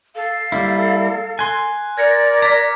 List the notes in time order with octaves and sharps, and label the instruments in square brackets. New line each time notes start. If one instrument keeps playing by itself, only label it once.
[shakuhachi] A4 [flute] F5
[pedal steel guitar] G3 A#3 E4
[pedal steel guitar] G#5 C6 [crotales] F#6
[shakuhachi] A#4 [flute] D5 [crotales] G#6 A#6 C#7
[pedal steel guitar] A#5 [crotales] D6 G#6 B6